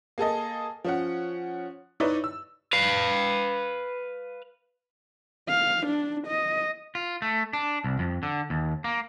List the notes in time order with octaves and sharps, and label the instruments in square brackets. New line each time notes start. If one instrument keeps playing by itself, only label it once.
[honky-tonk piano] A#3 G#4 A4 D#5
F3 C#4 F#5
D#4 E4 B4 C#5 D5 E5
E6
[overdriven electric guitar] B4 F5
[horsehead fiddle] F5
D4
D#5
[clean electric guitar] F4
A3
D4
C2
F2
D3
D#2
A#3